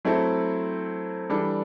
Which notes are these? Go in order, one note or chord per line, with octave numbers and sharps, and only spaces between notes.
F#3 A3 C4 E4 A4
E3 G3 D4 A4